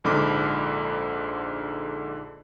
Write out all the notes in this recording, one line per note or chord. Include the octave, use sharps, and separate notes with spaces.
A#1 G#2 D3 B5 D6